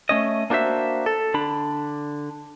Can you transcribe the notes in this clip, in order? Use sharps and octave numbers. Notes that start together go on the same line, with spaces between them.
A3 C#4 D#5
A#3 D4 F#4 C5 E5
A4
D3 D4 B5